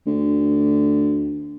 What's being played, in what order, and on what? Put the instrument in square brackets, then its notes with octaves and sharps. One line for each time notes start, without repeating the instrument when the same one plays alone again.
[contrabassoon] D2